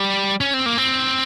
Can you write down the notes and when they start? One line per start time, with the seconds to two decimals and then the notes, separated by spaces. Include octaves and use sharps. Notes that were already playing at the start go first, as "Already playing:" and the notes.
Already playing: G3
0.41 C#4
0.54 C4
0.66 A#3
0.78 C4